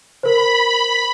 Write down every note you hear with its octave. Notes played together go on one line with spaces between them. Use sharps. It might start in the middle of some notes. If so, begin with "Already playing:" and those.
A#4 C5 B5